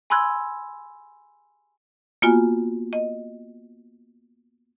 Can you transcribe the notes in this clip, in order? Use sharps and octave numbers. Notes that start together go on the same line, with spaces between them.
G#5 B5 C6 E6 F#6 G#6
A#3 B3 F4 F#4 G#5
D#5